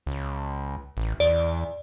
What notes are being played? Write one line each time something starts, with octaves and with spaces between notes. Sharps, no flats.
C#2
A1
E2 D5